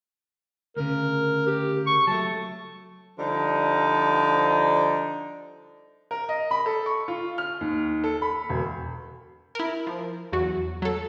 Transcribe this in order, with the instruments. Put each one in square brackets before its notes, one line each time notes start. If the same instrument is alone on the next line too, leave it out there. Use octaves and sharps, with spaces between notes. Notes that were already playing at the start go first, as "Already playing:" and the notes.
[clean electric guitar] D2 C#3 [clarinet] A#4
[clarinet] G4
C#6
[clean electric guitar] F#3 A3 [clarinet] A5
[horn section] D3 F3 G3 D#4
[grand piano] A#4
D#5
B5
A4
C#6
F4
F6
D#2
A4
B5
E1
[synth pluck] E4 A#4
F3
E2 F#3 F#4
F#3 A4